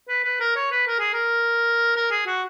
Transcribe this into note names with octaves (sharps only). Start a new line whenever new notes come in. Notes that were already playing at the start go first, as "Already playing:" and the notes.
B4
B4
A#4
C#5
B4
A#4
G#4
A#4
A#4
G#4
F#4